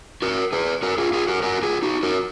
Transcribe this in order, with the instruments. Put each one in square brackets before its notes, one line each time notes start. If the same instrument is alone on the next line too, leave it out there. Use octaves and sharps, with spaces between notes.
[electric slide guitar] F#4 A#4
G#4 B4
F#4 A#4
F4 G#4
F4 G#4
F#4 A#4
F#4 A#4
F4 G#4
D#4 F#4
F#4 A#4